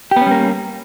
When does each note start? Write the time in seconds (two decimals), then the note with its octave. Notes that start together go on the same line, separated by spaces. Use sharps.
0.11 G4
0.16 B3
0.21 C#4
0.26 G3
0.31 A#3